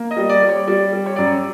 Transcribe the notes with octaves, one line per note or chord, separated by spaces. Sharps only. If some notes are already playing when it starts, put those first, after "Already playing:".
Already playing: A#3
D#5
G3
D5
G3
C#5
G3 D5
G3
C#5
F#2 D5
C#5